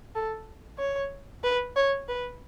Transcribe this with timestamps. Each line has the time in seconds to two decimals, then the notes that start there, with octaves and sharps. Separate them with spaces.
0.15 A4
0.79 C#5
1.44 B4
1.76 C#5
2.08 B4